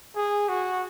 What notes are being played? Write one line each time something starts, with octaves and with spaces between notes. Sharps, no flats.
G#4
F#4